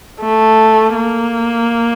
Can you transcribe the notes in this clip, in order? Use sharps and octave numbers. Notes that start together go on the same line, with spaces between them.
A3
A#3